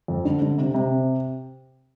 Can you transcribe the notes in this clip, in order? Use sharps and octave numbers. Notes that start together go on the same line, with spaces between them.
F2
D3
D3
C3
C3